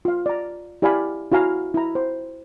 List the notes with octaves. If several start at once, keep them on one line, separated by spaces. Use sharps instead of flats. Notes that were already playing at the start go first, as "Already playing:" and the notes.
F4 F5
D5 A#5
E4 G4 D5 F5 G#5 B5
E4 F#4 F5 G#5 A#5
E4 A#5
C5